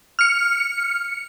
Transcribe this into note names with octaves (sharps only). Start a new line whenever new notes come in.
F6 C#7